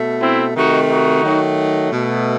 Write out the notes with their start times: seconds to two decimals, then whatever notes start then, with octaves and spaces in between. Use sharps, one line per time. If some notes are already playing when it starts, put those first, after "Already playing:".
Already playing: B2 A3
0.21 C4 E4
0.55 C3 D#3 A3 D#4 F#4
0.90 D#4 F#4
1.24 D#3 F#3 A3
1.92 B2 A3